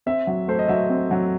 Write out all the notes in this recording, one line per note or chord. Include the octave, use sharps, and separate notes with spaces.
C4 E5
F#3
A3 C5
D#5
F#3 E5
C4
F#3